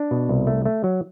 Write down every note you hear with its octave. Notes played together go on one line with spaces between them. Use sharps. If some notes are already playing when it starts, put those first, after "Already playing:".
Already playing: D4
B2
C2
A3
A3
F#3